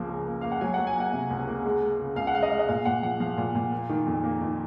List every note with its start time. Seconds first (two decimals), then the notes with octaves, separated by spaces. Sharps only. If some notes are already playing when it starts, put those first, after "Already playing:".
Already playing: C#2 F3 A#3
0.09 C#3
0.26 A#3
0.41 A#3 F5
0.52 F#5
0.61 F#3 G#5
0.74 F#3 F#5
0.87 G#5
0.96 A#3 F#5
1.13 C3
1.30 C#2
1.47 A#3
1.65 G#3
1.82 G#3
1.99 C#3
2.16 C#2 F5
2.27 F#5
2.34 G#3 F5
2.43 D#5
2.51 G#3
2.59 D#5
2.69 A#2 F5
2.85 A#2 F#5
3.03 F3 F#5
3.20 F3 F5
3.38 A#2
3.55 A#2
3.72 A#3
3.89 D#3
4.07 F2
4.24 A#3
4.41 D#3